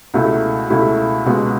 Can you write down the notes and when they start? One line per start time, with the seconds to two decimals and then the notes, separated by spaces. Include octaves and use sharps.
0.14 C#2 B2 A3 E4
0.70 C#2 B2 A3 E4
1.26 C#2 B2 G#3 B3